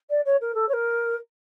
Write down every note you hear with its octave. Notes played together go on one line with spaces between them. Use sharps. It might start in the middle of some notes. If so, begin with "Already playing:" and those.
D5
C#5
A#4
A4
C#5
A#4